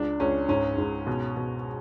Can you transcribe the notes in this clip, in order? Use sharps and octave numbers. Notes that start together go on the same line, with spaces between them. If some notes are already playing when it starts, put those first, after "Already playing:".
Already playing: C#2 D4
C#2 C#4
G#2 C#4
G#2
B2
B2